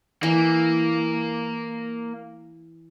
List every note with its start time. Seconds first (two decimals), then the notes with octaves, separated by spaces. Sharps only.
0.23 E3 A#3